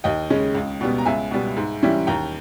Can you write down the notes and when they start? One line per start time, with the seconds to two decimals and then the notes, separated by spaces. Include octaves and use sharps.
0.04 D#2 D#5 G5
0.30 C#3 G#3 C#4
0.55 C#2
0.81 B2 G3 B3
0.98 A#5
1.05 C#2 E5 G#5
1.31 B2 G3 B3
1.57 G#2
1.83 E3 G3 C#4 E4
2.07 D#2 G5 A#5